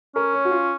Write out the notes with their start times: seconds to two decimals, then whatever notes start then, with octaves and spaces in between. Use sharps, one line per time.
0.15 C#4 A#4
0.34 C#5
0.45 F#4
0.51 F4